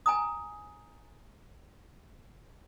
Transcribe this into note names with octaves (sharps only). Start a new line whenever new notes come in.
G#5 A#5 D#6